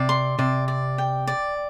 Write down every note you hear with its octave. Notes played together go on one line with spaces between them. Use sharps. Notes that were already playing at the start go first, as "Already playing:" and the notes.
Already playing: C3 D5
C6
C3 D5
D5
G5
D5